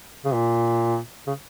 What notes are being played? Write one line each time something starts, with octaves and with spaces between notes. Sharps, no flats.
C#3
A#2
C#3